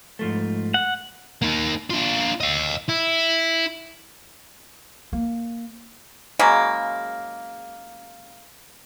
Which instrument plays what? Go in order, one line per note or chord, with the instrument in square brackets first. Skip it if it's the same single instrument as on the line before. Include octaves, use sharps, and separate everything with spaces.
[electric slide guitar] G#2 F3 A3
[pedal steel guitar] F#5
[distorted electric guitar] A#3 D#4
D4 F4
D#5 F5
E4
[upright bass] A#3
[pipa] C#3 F#3 G#3 A#3